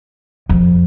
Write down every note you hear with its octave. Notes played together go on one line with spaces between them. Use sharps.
F2